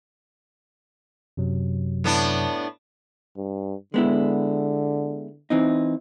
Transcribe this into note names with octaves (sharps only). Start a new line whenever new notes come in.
F#2 C3 F#3
A2 B3 D4
G2
D3 G#3 B3 E4
E3 C4 D#4